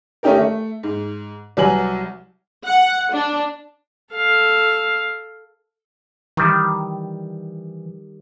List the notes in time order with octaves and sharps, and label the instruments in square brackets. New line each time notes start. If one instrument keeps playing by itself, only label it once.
[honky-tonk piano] A3 C#4 D#4 G4 A#4
A3
G#2
C2 F#3 B4 G#5 F#7
[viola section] F#5
D4
[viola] A4 F5
[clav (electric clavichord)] D#3 G3 [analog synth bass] E3